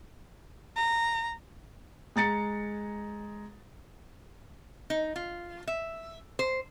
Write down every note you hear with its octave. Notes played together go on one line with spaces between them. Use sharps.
A#5
G#3 A#5 A6 C#7
D#4
F4
E5
C5